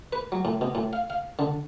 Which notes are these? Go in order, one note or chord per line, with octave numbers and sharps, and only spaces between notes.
B4
F#3
A2
B2
A2
F5
F5
D3